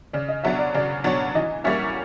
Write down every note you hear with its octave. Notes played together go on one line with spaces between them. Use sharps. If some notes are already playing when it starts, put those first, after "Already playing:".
C#3 D5
D#5
F#3 B3 D4 E5
D5
C#3 D5
F#3 B3 D4 C#5
E3 D#5
G3 A#3 C#4 F#4 E5